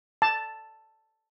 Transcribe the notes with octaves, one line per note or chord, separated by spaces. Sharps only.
A5